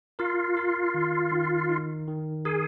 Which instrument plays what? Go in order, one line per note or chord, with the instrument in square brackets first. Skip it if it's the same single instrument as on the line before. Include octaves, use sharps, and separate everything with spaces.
[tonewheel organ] F4 [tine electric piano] A#4
[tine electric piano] A#4
D#3
D#3
D#4
D#3
[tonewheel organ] G#4 [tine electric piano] A#4